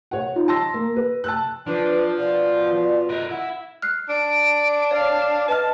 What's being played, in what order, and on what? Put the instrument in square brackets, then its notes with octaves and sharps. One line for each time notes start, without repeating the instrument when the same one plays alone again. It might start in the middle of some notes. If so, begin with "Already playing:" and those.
[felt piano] C#5 F#5
D#4 F4
A5 C6 E6 A#6
A#3
B4
A5 E6 F#6
[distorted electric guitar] F3 [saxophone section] D4 [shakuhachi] B4
[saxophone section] B2 F4 [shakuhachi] D5
[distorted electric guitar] A#4 B4 [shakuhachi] D#5
[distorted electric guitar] E4 [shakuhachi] F#5
[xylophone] F6 F#6 C7
[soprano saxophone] D4 [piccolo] D7
[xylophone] C#5 [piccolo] F5
[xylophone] E7
[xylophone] B4 D#5 F6 [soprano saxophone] A5